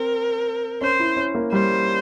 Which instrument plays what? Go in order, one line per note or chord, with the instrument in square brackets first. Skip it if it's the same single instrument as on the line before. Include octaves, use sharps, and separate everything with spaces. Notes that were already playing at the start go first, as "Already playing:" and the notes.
Already playing: [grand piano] C4 [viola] A#4
[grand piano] C#4 [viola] C5
[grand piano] E4
C#4
A#3
[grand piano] G3 [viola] C5